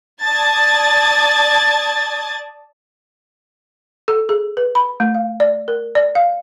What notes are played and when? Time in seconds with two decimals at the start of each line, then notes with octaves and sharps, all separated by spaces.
0.22 D5 A5 D#6 G#6 A6
4.08 A4
4.29 G#4
4.57 B4
4.75 B5
5.00 A3
5.15 F5
5.40 D5
5.68 A#4
5.95 D5
6.15 F5